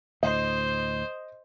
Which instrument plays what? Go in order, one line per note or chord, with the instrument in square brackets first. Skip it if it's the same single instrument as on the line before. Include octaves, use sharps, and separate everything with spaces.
[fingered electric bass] D2 A2 [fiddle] C5 [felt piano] D#5